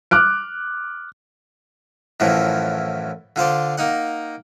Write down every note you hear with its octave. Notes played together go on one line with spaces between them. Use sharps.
D6 F6 F#6 D7
F#2 A2 E3 F3
D3 F4 C5 D5
A#3 D#4 F#5